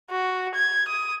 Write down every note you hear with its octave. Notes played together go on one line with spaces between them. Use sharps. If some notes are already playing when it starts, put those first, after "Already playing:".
F#4
G#6
D#6